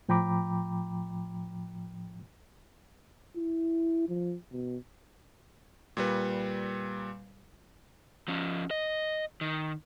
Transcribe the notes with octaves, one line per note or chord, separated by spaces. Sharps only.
A2 F3 G5 A#5 B5 D6
E4
F3
B2
A#2 G3 B4
F3 C#4
D#5
D#3